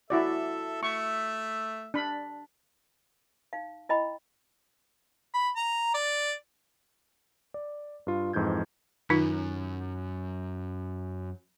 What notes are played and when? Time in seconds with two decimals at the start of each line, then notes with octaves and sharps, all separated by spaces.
0.10 E4 F#4 A4 D5 E5
0.83 A3 E5 C#6
1.94 D4 B5
3.53 D#4 F5
3.89 E4 D#5 G5 B5
5.34 B5
5.56 A#5
5.94 D5
7.54 D5
8.07 G2 F4
8.33 F2 G#2 E3 G6 G#6
9.10 F#2 D#3 D#4 F4